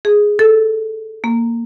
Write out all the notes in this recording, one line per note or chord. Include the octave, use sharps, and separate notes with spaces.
G#4
A4
A#3